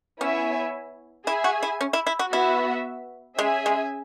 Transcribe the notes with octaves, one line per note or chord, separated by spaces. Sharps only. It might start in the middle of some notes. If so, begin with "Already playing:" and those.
B3 C#4 E4 C#5 E5 G#5
E4 G#4 E5 G#5
F#4
E4
C#4
E4
E4
F#4
B3 E4 F#4 E5
G#3 C#4 G#4 E5 G#5
G#3